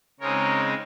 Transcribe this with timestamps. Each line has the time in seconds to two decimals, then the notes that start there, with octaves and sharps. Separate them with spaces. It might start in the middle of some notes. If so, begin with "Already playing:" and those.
0.20 C#3 G#3 C4 D#4 A#4 C#5